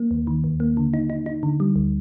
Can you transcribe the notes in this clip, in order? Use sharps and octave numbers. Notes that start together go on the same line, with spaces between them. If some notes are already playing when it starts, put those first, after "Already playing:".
Already playing: A#3
D#2
D#3
D#2
A#3
D3
D#4
D#4
D#4
D3
G3
D2